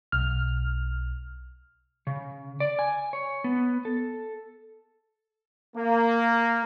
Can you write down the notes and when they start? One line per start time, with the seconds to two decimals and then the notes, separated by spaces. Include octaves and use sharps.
0.12 B1 F6
2.07 C#3
2.60 D5
2.79 G#5
3.13 C#5
3.44 B3
3.85 A4
5.76 A#3